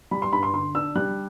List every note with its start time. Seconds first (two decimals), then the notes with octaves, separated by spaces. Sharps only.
0.11 G3 B5
0.22 C6
0.33 G2 B5
0.43 C6
0.53 D3 C6
0.75 D4 E6
0.95 G3 F#6